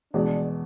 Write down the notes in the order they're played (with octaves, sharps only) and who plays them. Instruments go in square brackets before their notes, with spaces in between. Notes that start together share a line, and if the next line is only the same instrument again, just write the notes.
[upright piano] E2 B2 G#3 [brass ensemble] D4 D5